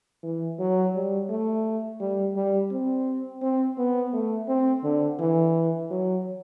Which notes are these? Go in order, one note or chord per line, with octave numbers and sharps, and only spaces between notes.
E3
F#3
G3
A3
G3
G3
C4
C4
B3
A3
C4
D3
E3
F#3